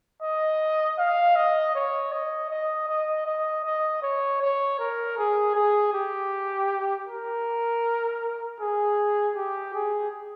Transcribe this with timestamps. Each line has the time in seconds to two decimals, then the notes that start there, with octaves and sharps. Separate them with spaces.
0.22 D#5
0.98 F5
1.36 D#5
1.75 C#5
2.12 D#5
2.50 D#5
2.88 D#5
3.26 D#5
3.65 D#5
4.02 C#5
4.41 C#5
4.79 A#4
5.18 G#4
5.55 G#4
5.93 G4
7.07 A#4
8.60 G#4
9.36 G4
9.74 G#4